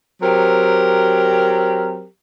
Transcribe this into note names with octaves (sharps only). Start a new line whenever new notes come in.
F#3 C4 G4 A#4